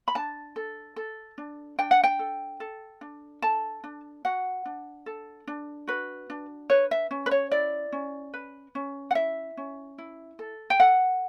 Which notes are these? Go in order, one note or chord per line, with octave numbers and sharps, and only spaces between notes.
B5
D4 A5
A4
A4
D4
D4 G5
F#5
G5
A4
A4
D4
A4 A5
D4
F#4 F#5
D4
A4
D4
F#4 B4
D4
B4 C#5
E5
C#4
B4
C#5
E4 D5
C#4
B4
C#4
F#5
E4 E5
C#4
E4
A4
G5
A4 F#5